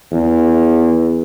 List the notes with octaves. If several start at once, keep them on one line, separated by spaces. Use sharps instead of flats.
E2